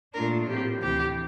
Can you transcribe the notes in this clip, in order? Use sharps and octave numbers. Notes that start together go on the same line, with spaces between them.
A#2 A3 D4 F4 A#4
A2 F3 C4 G4
D2 C3 E3 G4